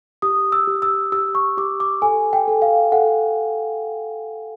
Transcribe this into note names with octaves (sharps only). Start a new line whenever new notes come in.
G4 D#6
E6
G4
E6
G4 E6
C#6
G4 D6
D6
A4 G#5
G5
A4
F5
A4 F#5